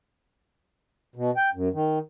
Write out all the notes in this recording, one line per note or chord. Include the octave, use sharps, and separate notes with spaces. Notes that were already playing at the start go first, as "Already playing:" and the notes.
B2
G5
F#2
D#3